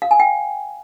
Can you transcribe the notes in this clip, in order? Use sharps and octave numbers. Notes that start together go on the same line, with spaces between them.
F5
G#5
G5